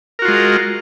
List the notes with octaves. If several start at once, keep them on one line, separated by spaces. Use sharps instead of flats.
G#3 F4 F#4 A#4